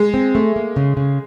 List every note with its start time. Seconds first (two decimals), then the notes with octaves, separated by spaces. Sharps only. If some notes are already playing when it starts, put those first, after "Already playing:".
Already playing: G#3
0.14 C4
0.35 A3
0.56 A#3
0.76 C#3
0.97 C#3